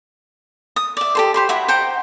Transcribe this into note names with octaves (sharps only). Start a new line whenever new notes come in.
D#6
D5 E5
G4 A4 C5
G4 C5 B5
E4 F#4 E5
C5 F#5 G5 A#5